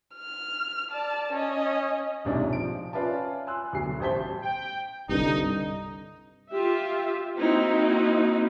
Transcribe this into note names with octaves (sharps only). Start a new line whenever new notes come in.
F6
D5 A5
C#4 D#5
D#1 B1 G#2 C3 D4 C#5
F3 D7
C#4 F4 B4 D5 E5 A5
G#5 C6 E6 F#6
D2 B2 F#3 C7
A1 G3 C5 A5 B6 G7
G5
C2 G2 D3 D#4
F4 G4 E5
A#3 C4 D#4 E4 F#4